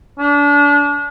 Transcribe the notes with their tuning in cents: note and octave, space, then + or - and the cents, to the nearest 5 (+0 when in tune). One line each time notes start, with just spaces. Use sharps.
D4 -30